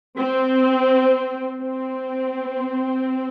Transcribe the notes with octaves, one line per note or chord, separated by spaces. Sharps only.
C4
C4